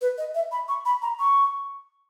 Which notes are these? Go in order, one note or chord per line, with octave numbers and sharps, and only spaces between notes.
B4
D#5
E5
B5
C#6
B5
A#5
C#6